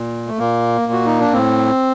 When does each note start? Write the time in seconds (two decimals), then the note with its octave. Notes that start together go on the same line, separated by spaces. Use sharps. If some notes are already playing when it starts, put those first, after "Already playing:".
Already playing: A#2
0.27 A3
0.39 A#2 A#3
0.86 A#2
0.93 F#4
1.06 D#4
1.20 D4
1.33 A2 C4